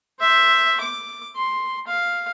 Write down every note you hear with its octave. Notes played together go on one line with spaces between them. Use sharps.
C5 E5
D6
C6
F5